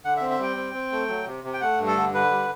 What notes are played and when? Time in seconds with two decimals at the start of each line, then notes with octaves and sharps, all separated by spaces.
0.05 D3 F#5
0.17 E5
0.21 C4
0.30 E5
0.39 G3 G5
0.57 C4
0.74 C4
0.92 A3
1.09 F#3
1.26 C3
1.44 C3
1.54 G5
1.61 A3 F#5
1.79 G2
1.87 A4
1.96 D3
2.14 D3 B4
2.31 G3